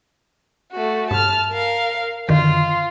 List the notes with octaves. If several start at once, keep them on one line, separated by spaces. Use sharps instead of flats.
A3 F#4
G2 A5 F6
A#4 F5
F#2 D3 D#3 F4